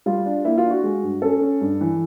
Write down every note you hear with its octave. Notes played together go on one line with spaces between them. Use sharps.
G3 F4
D4
A#3 E4
F4
D4
F#4
G#3
G2
C#4 A4
C#4
G2
E3